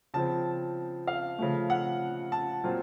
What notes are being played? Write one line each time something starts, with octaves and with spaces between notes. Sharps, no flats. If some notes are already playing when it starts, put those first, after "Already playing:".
C#3 F3 C4 A5
F5
C#3 F3 A3
F#5
A5
A#2 F#3 C4 F4